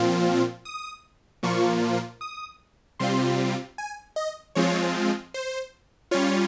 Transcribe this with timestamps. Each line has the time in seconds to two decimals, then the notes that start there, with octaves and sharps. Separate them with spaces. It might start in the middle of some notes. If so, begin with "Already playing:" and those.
Already playing: A#2 F3 C4 F4
0.65 D#6
1.43 A#2 F3 A#3 F4 C#6
2.21 D#6
2.99 C3 G3 C4 F4 C6
3.78 G#5
4.16 D#5
4.55 F3 G#3 C4 F4 C#5
5.34 C5
6.11 G3 C#4 F4 C#5